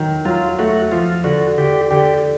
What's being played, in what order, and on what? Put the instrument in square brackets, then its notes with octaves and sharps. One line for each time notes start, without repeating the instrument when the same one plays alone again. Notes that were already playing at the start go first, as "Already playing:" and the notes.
Already playing: [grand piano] D#3 F#3
[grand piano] F#3 [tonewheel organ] F4
[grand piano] A3 [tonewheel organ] F#4
[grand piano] F3 [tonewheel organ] F4
[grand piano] D3 [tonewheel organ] F#4
[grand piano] D3 [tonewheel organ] G4
[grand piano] D3 [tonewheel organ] G4